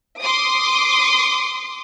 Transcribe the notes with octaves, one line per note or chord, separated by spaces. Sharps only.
C6 D6 D#6